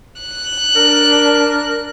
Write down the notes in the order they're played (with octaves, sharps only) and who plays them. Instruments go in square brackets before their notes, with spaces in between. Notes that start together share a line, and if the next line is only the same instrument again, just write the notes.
[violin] F#6
[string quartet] D4 [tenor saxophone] A#4